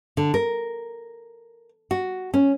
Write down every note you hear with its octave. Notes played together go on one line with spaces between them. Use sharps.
D3
A#4
F#4
C#4